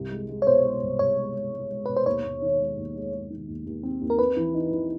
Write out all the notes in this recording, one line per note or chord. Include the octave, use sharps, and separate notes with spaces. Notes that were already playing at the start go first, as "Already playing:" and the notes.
Already playing: C2
G#3
G#3
C#5
B2 C5
G#3
C2
C2 C#5
G#3
G#3
G#3
G#3
B2 B4
C5
D#2 C#5
D#2
D#3
G#3
D#2
G#3
G#3
D#3
D#2
D#2
C4
D#2
A#4
C4 B4
E3
D#4
E3